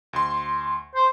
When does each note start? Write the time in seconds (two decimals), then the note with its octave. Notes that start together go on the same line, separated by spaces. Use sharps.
0.13 D2 C6
0.95 C5